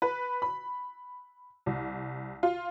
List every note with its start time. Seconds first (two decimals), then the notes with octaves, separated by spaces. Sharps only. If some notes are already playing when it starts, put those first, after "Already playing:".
0.02 B4
0.42 B5
1.66 C2
2.43 F4